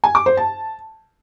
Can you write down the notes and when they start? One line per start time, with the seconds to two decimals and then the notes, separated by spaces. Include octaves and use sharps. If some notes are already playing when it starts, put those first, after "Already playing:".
0.04 G#5
0.15 D6
0.26 C5
0.37 A5